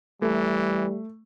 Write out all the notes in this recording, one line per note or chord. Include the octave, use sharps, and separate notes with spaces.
E3 G3 A3